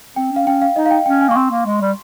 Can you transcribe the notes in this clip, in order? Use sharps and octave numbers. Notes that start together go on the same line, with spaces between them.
C4 G5
C#4 F5
C#4 G5
F5
D#4 D#5
F5
G5
C#4 G5
G#5
A#3 C#6
C4 C6
A#3
G#3
G3